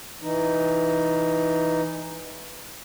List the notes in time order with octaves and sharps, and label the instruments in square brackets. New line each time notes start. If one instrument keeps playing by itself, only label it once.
[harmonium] E3 D#4